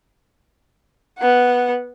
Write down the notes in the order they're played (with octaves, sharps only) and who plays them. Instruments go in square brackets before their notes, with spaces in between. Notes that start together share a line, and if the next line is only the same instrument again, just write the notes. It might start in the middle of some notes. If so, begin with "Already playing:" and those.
[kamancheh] B3 F#5